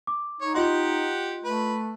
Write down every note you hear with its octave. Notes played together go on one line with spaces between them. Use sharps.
D6
D#4 C#5
F4 G4 D#5 F#5 C6
A3 B4